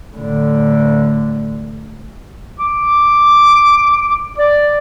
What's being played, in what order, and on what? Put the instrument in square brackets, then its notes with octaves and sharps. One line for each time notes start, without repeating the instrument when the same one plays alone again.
[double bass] A2 D3
[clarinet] D6
D5